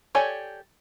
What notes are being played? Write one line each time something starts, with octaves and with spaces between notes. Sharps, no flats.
G4 A4 C#5 D5 G#5